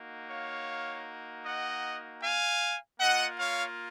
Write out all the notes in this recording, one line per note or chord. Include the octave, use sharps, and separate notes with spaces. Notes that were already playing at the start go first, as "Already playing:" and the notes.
Already playing: A#3 D#4 F#4
C#5 F5
D#5 F#5
F5 G#5
A#3 F4 D#5 F#5
C#5 F5